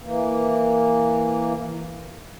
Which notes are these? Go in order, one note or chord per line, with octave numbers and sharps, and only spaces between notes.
E3 A#3